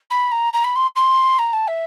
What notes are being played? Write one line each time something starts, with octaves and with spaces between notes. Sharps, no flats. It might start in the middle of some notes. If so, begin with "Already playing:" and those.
B5
A#5
A#5
B5
C6
C6
A#5
A5
E5